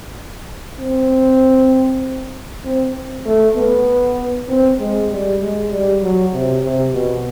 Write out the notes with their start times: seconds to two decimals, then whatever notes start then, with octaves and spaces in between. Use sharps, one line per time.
0.80 C4
2.65 C4
3.26 A3
3.55 B3
4.49 C4
4.79 G#3
5.10 G3
5.40 G#3
5.70 G3
6.02 F#3
6.33 C3
6.63 C3
6.93 B2